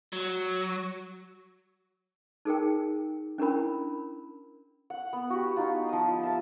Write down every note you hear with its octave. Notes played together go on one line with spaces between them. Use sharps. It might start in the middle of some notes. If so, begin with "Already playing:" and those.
F#3
D#4 G#4 A#4 G5
C#4 D4 E4 A#4 B5
F#5
B3
F#4 G4
D#4 F4
F3 D#5
E5 A5